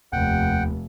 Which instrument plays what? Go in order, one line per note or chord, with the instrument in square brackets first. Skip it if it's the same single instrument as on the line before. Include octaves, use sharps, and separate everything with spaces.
[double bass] F1 [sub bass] D#2 [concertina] F#5 G5